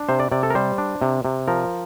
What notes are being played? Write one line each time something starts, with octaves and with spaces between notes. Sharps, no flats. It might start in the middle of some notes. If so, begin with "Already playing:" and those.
Already playing: D4
C3 C5
D5
C3 D5
A4
A#4
G3 C5
D4
C3
C3
F3 A#4